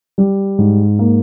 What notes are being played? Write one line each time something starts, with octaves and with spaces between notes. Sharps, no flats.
G3
G#2
A#3